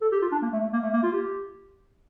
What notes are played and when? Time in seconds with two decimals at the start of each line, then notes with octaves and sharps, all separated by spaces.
0.02 A4
0.12 G4
0.22 F4
0.32 D4
0.42 A#3
0.53 A3
0.63 A3
0.73 A#3
0.83 A3
0.93 A#3
1.03 F4
1.13 G4